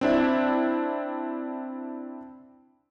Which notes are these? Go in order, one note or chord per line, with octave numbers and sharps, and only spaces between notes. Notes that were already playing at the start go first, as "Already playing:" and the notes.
C4 D4 E4